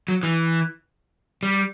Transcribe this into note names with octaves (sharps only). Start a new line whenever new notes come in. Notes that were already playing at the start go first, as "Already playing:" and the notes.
F#3
E3
G3